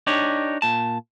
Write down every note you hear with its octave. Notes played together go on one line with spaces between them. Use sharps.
D4 D#4 G4 C#5
A#2 A5